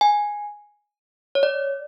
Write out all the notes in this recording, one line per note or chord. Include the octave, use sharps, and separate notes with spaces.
G#5
C#5
D5